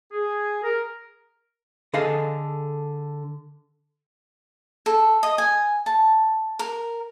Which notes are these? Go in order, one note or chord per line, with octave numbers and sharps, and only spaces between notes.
G#4
A#4
D3 G#4 A4 D#5 F5
A4
D#5
G#5
A5
A#4